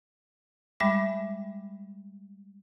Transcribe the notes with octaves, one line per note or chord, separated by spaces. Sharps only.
G3 G#3 E5 B5 D6